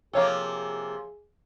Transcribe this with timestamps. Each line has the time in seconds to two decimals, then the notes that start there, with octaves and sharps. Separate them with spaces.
0.13 C3 F3 A#3 G#4 A4 C#5 F5